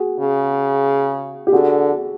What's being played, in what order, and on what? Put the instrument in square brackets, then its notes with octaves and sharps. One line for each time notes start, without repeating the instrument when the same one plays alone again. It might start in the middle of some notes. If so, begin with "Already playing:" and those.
Already playing: [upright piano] F#4 G#4
[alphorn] C#3
[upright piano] G4
[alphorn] D3 [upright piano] F#4 G#4